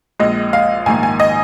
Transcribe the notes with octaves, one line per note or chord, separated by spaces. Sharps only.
A#1 A#2 G#3 D#5
F5
A#1 G#2 D#3 A#3 G#5
G#5
D#5